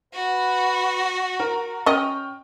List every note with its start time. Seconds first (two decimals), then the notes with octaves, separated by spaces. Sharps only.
0.14 F#4 B4
1.40 A#4 A#5
1.86 C#4 D#5 G5 C#6 F6